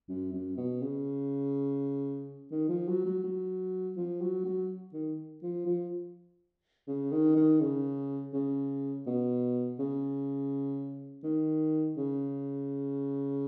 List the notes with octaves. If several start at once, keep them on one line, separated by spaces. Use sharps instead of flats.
F#2
F#2
B2
C#3
D#3
F3
F#3
F#3
F#3
F3
F#3
F#3
D#3
F3
F3
C#3
D#3
D#3
C#3
C#3
B2
C#3
D#3
C#3